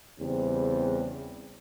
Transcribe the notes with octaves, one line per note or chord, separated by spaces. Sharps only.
E2 C#3 G3 C4